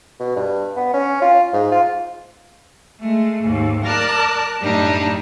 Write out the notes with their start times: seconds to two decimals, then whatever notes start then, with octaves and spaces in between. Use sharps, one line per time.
0.20 B2
0.36 G2
0.77 B3
0.94 C#4
1.22 F4
1.53 G#2
1.72 F4
3.00 G#3 A3
3.43 D#2 G#2
3.85 A#4 D5 A5 F#6
4.60 F#2 A2 G3 D4 D#4